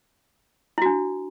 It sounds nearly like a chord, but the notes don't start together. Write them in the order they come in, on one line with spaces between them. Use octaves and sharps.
E4 F#4 D4